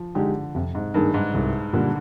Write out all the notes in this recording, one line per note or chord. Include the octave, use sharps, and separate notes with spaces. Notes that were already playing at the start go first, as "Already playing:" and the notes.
Already playing: F3
D3 G#3 D#4 G4
F2 C3
G#2
G2 D#3 A#3 D#4 G#4
G#2
C2 G#2
A#2 D3 G3 A#3 D4